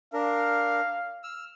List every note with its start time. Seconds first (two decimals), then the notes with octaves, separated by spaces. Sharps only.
0.14 D4 A#4 F5
1.24 E6 F6